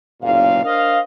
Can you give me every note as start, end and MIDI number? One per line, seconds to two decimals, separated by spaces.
0.22 0.60 30
0.22 0.60 35
0.22 0.60 46
0.22 0.60 77
0.65 1.00 62
0.65 1.00 70
0.65 1.00 72
0.65 1.00 75
0.65 1.00 77